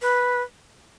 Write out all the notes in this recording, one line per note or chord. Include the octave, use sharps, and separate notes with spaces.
B4